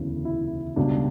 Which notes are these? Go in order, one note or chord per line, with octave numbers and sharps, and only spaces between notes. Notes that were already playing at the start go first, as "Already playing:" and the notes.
Already playing: E1 D2 C#3 E3
E4
C#2 B2 G3 D4